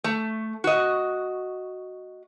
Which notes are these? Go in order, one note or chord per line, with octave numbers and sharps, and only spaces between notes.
A3
F#4 D#5